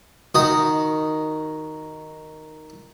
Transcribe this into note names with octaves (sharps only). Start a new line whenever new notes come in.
D#3 F#4 D#6